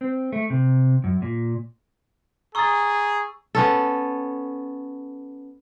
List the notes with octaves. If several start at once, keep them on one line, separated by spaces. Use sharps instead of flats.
C4
A3
C3
F#2
A#2
G#4 A#5 C#6 D#6 E6 A6
B3 C#4 A4